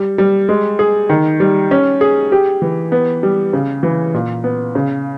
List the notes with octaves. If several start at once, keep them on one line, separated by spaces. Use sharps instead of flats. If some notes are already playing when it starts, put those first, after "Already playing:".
Already playing: G3
G3
G#3
G#4
D#3
G3
C#4
G#4
G4
E3
B3
G3
C#3
E3
A#2
B3
C#3